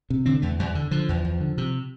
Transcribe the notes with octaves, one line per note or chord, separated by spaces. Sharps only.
C3
D3 C4
E2 A3
E2 G3
D3
D3 F3
E2
E2
D3
C3